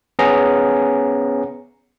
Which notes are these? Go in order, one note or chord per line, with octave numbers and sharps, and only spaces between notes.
B3 C#4 G#4 A#5